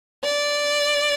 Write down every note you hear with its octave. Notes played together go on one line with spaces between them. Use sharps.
D5